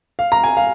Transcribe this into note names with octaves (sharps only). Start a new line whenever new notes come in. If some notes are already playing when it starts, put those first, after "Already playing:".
F5
A#5
G#5
F5